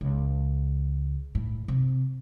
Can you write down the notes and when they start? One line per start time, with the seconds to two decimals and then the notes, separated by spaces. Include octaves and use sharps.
0.01 C#2
1.35 A2
1.68 C3